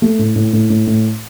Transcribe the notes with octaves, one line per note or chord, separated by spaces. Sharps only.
A3
A2
A2
A2
A2
A2